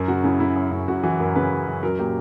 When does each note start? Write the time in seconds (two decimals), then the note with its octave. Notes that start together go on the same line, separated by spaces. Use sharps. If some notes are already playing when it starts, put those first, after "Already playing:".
Already playing: F#2 A#4
0.08 C#3 F#4
0.24 C#3 E4
0.40 C#3 E4
0.56 F#2
0.71 F#2
0.88 F#2 F#4
1.03 E3 F#4
1.20 F#2 A#4
1.35 C#3 B4
1.51 F#2
1.67 F#2
1.83 F#3 A#4
1.99 A#2 G4